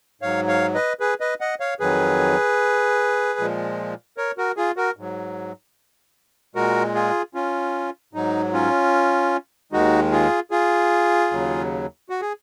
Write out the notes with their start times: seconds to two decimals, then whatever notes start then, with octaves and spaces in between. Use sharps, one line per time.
0.21 G#2 F#3 C#5 F5
0.48 C#5 F5
0.75 B4 D#5
1.00 G#4 B4
1.20 B4 D#5
1.41 D#5 F#5
1.60 C#5 F5
1.80 F2 D#3 F#3 G#4 B4
3.39 A#2 F3 G#3
4.17 A#4 C#5
4.38 F#4 A#4
4.57 F4 G#4
4.76 F#4 A#4
4.97 G#2 F#3
6.55 A#2 G#3 F#4 A#4
6.94 F4 G#4
7.35 C#4 F4
8.13 G#2 F#3 D#4
8.53 C#4 F4
9.72 D#2 D#3 G#3 D#4 F#4
10.12 F4 G#4
10.51 F4 G#4
11.31 D#2 C#3 F#3
12.10 F#4
12.21 G#4